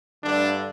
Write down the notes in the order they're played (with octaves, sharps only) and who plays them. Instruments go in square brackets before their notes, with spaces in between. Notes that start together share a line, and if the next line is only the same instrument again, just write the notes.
[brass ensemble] G2 D3 A3 D4